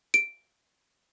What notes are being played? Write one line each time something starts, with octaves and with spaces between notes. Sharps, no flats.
D7